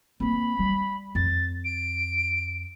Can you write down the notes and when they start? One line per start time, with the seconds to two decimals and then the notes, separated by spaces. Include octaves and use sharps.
0.20 A#3 C4 B5
0.59 G3
1.15 F2 A6
1.64 D7